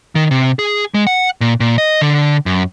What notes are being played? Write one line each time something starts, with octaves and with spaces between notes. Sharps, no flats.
D#3
C3
G#4
G#3
F#5
A#2
A#2
D#5
D3
F#2